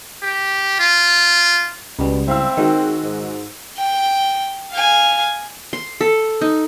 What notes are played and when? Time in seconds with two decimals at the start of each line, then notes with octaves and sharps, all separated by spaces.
0.23 G4
0.80 F4
1.99 C#2 B2 G3
2.28 C4 E4 F5 E6
2.57 D#3 G#3 F#4
3.04 G#2
3.77 G5
4.71 F5 G#5
5.73 C6
6.01 A4
6.41 D#4